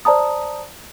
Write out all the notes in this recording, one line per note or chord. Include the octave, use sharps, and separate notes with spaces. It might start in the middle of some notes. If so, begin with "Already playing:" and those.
C5 D5 A5 A#5 D#6